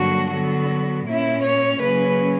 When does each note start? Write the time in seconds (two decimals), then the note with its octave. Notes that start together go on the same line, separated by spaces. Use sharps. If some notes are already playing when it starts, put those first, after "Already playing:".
Already playing: G2 D3 F#3 A#3 D4 F#4
0.30 D3 F#3 B3 F#4
1.06 A#2 A#3 C#4 E4
1.43 C#5
1.81 C#3 F#3 A#3 C#4 B4